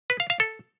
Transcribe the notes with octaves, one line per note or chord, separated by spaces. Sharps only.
B4
F5
F5
A4